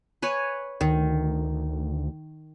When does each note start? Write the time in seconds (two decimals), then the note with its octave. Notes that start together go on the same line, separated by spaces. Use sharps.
0.22 B4 C#5 G#5
0.81 D2 D#3